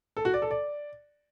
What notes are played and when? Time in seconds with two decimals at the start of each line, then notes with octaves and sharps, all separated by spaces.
0.17 A4
0.25 F#4
0.34 D5
0.42 A4
0.51 D5